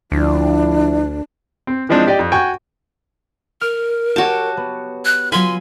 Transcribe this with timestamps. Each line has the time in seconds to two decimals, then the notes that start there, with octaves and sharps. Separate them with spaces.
0.12 D2 F3 D4 E4
1.67 C4
1.89 E3 F3 G#3 C4 D4 D#4
2.07 G4 D5 D#5 G5
2.19 F2
2.32 F#4 G5 G#5 C#6
3.61 A#4 F6
4.16 F#4 G4 C#5 A5
4.57 B3
5.05 F#6
5.32 F#3 F4 G#5 B5 C6